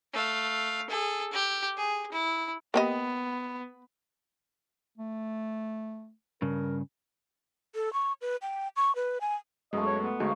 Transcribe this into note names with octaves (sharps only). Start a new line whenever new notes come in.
A3 F5
G#4 A4
G4
G#4
E4
A#3 B3 G4 D#5
A3
G2 C#3 A#4
A4
C#6
B4
G5
C#6
B4
G#5
F#2 B2 G#3 A3 D#5
C#5
B3
D2 G#3 D#4 F#4 C#5 F5